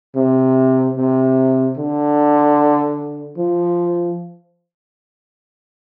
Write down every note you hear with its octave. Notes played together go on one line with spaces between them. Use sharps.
C3
C3
D3
F3